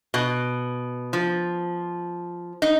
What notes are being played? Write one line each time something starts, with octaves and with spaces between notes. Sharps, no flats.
B2
F3
D#4